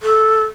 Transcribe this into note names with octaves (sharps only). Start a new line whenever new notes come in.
A4